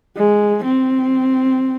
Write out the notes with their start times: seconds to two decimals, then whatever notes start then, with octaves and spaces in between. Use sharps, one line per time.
0.17 G#3
0.64 C4